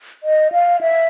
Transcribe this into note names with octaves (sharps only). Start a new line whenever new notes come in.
D#5
F5
E5